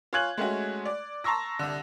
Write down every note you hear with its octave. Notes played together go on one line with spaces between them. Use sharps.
F4 C#5 G#5 F#6 G#6 F#7
G#3 A3 C#4 F#4
D5
A5 A#5 C6 C#6 E6 A#6
C2 D3